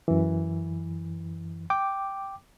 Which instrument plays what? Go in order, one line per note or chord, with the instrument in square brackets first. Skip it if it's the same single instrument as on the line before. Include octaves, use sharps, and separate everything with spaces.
[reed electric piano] F#2 E3
G5 D6